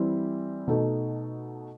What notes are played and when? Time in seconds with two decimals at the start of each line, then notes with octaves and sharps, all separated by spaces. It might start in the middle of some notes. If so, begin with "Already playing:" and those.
Already playing: E3 G3 C4 E4
0.68 B2 A3 D#4 A4